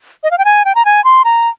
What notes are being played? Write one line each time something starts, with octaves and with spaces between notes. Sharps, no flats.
D#5
F5
G5
G#5
G5
A#5
G#5
C6
A#5